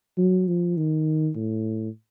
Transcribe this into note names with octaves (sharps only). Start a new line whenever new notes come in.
F#3
F3
D#3
A2